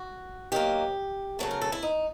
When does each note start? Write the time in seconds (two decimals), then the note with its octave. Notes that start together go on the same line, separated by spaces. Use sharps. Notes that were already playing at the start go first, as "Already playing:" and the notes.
Already playing: F#4
0.52 D#3 F#3 A#3 G4
1.39 C#3 F#3 A3 A4
1.51 A#4
1.61 A4
1.72 E4
1.83 D#4